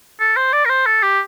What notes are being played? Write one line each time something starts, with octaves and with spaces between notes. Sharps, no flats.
A4
C5
D5
A#4
C5
A4
G4